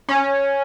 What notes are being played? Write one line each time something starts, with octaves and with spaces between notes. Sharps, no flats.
C#4